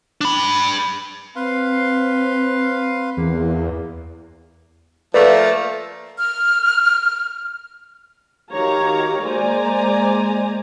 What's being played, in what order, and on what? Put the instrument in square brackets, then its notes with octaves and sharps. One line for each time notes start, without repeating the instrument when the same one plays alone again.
[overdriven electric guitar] D4 B5
[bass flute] C4 [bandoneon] B4 F5 C6
[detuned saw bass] E2 [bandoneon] A#3
[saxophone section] F3 A3 A#3 [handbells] B4 D5
[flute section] F6
[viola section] D#3 F#4 G4 C#5 F5 A#5
G#3 A#3 C5 D5 G#5 A#5